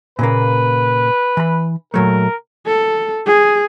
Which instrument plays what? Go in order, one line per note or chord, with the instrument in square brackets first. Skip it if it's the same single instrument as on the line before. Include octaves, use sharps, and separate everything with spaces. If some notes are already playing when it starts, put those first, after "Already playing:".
[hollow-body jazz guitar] A#2 C#3 A#3 [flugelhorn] B4
[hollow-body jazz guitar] E3 B5
[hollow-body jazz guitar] A#2 F#3 A3 [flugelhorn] A#4
[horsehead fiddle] A4
G#4